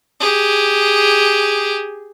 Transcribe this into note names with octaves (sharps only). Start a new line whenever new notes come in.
G4 G#4